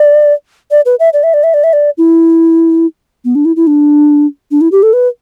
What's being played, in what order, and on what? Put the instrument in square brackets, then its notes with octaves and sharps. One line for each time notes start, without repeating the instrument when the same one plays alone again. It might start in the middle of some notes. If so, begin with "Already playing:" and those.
Already playing: [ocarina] D5
D5
B4
E5
D5
E5
D5
E5
D5
E5
D5
E4
B3
D4
E4
E4
D4
D4
E4
G4
A4
B4